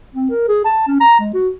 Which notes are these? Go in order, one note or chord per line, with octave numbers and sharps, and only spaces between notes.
C4
A#4
G#4
A5
C#4
A#5
G#3
F#4